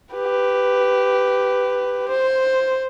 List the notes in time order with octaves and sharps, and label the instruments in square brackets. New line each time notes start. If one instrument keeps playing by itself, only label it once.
[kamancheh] G4 B4
C5